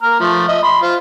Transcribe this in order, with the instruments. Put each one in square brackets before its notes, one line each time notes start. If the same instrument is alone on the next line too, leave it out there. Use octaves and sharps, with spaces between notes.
[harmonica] A#3 A#5 F6
F3 A3
D#5 E5
B5 C6
F4 C5